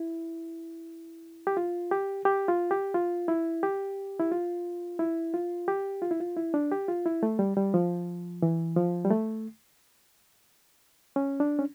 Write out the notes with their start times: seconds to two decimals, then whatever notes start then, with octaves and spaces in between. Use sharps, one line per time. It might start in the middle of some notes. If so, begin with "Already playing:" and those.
Already playing: E4
1.47 G4
1.57 F4
1.91 G4
2.25 G4
2.48 F4
2.71 G4
2.94 F4
3.28 E4
3.63 G4
4.20 E4
4.32 F4
4.99 E4
5.34 F4
5.68 G4
6.02 F4
6.11 E4
6.20 F4
6.37 E4
6.54 D4
6.72 G4
6.88 F4
7.06 E4
7.23 A3
7.39 G3
7.57 G3
7.74 F3
8.42 E3
8.76 F3
9.05 G3
9.10 A3
11.16 C#4
11.40 D4
11.59 C#4